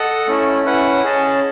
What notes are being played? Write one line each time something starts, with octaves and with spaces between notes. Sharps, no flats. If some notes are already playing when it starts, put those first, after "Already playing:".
Already playing: A4 D#5 F#5
A3 C#4 E4
C#4 E4 B4 F#5
C#4 G#4 D#5 A5